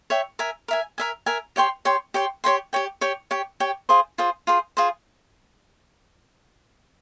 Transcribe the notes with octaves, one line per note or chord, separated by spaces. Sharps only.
C#5 E5 G5
A#4 E5 G#5
A#4 E5 G#5
A#4 E5 G#5
A#4 E5 G#5
G4 C#5 G5 C6
G4 C#5 G5 C6
G4 C#5 G5 C6
G4 C#5 G5 C6
G4 C#5 G5
G4 C#5 G5
G4 C#5 G5
G4 C#5 G5
F4 G#4 C5
F4 G#4 C5
F4 G#4 C5
F4 G#4 C5